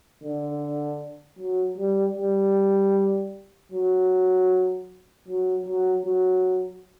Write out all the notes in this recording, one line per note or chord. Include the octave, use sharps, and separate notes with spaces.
D3
F#3
G3
G3
F#3
F#3
F#3
F#3